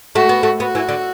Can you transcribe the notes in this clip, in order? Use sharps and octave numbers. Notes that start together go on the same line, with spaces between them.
A3 F#4
B3
A3
B3 F#4
E3
D3